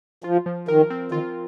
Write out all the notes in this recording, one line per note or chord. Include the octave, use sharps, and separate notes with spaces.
F3 F4
F3
D#3 A#4
C4
D#3 F4